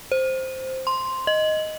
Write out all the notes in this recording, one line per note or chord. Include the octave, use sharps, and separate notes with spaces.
C5
C6
D#5